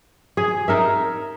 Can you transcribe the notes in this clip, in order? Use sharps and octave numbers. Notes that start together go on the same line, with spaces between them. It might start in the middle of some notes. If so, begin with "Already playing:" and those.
G#4
D#4 A#4 E5